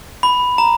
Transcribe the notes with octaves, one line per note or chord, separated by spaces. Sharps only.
B5
A#5